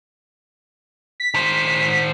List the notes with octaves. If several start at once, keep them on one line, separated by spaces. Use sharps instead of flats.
B6
D#3 C5